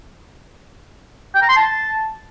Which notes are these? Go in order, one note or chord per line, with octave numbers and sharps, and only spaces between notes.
G5
A#5
C6
A5